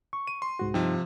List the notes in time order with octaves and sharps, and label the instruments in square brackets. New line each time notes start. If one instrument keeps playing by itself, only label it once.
[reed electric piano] C#6
[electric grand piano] D#7
C6
[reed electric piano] C2 G#2 F#4
[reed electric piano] G2 D#4 G5 [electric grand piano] C3 F3